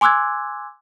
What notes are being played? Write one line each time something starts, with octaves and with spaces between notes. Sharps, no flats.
G#5 C6 D6 E6 F#6 G#6